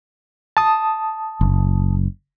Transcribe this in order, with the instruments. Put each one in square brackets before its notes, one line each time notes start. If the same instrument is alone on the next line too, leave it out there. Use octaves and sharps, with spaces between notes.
[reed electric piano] A5 D#6
[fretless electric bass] F#1